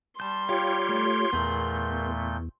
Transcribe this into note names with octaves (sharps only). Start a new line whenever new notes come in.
G3 A5 C6 G6
F4 G4 C#5 F5 G5
A3
E2 A#2 A3 B3 G#4 A#4 G6